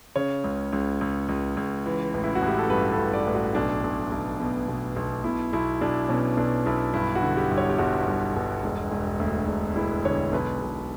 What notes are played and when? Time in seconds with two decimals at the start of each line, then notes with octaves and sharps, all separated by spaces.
0.16 C#3 C#5
0.44 C#2
0.73 C#2
1.01 C#2
1.29 C#2
1.57 C#2
1.86 E3
2.14 A1
2.24 E4
2.35 F#4
2.42 A1
2.47 G4
2.59 A4
2.70 G2 B4
2.92 A4
2.98 A1
3.13 D5
3.27 A1
3.34 F#4
3.55 B1 D4
3.84 B1
4.12 B1
4.40 B2
4.68 B2
4.96 B1
5.24 B2 E4
5.53 B1 E4
5.81 B1 D4
6.09 B2 C#4
6.37 B1 D4
6.66 B1 E4
6.94 G2 E4
7.15 F#4
7.22 D3
7.37 G4
7.51 G1
7.58 C#5
7.70 G4
7.78 G1 F#4
8.07 G1
8.36 G1
8.64 E1
8.91 E1
9.20 D2
9.48 E1
9.76 E1 E4
10.05 D3 C#5
10.32 B1 B4
10.62 B1